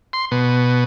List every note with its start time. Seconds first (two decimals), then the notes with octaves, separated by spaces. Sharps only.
0.13 C6
0.32 B2